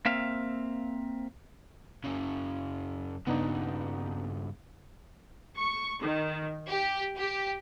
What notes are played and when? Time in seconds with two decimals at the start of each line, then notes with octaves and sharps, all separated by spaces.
0.05 A#3 C4 E5 F5
2.04 F#2 C#3
3.27 G2 C#3 B3 D4 D#4
5.57 C#6
6.02 D#3
6.69 G4
7.17 G4